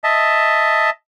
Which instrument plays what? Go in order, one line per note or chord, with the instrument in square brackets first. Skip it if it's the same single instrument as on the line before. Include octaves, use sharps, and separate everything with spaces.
[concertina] D#5 E5 A5